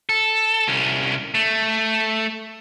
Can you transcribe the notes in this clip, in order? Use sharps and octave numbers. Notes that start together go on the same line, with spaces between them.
A4
C2 C#4
A3